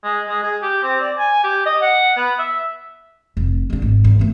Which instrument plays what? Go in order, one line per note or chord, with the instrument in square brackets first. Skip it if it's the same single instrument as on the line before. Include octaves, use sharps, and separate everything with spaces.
[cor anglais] G#3
G#3
G#4
G4
C4
D5
G#5
G4
D#5
F#5
B3
E5
[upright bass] F1
G#3 D4
G#1
G2
A3 B3